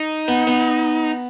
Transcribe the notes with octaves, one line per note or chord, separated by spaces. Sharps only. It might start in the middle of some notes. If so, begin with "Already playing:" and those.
Already playing: D#4
B3
B3